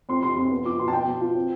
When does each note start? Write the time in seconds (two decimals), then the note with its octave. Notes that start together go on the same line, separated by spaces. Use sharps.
0.09 F2 C6
0.23 C3 C6
0.37 F2 C6
0.51 B3
0.65 F4 D6
0.79 B2 C6
0.88 A5
0.93 B3 G5
1.07 B2
1.21 F4
1.35 C4